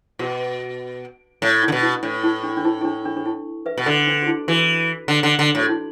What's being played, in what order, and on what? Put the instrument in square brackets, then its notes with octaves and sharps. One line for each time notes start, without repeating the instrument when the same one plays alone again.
[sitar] B2 [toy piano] F#4
[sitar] A2
[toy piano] E4
[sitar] D3
B2
[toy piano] E4
[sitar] A2 [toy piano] D4
[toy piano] E4
D4
D4
E4
E4
D4
D4
D4
E4
B4 E5
[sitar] B2
[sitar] D3 [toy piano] A4 D5
[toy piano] D4
F#4
E4
[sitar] E3 [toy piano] F#4
[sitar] D3
D3
D3
[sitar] A2 [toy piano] F#4
[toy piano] E4